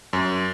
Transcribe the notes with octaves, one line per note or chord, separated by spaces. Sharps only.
F#2